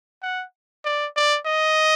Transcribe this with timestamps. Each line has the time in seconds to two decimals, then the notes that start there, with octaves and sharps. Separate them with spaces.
0.23 F#5
0.85 D5
1.16 D5
1.46 D#5